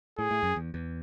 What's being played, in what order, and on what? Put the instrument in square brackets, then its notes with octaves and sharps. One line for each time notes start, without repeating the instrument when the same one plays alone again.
[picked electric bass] A2 [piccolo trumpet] G#4
[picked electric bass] A2
F#2
E2
E2